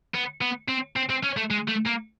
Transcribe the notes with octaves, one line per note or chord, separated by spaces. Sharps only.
B3
B3
C4
C4
C4
C#4
A3
G#3
A3
A#3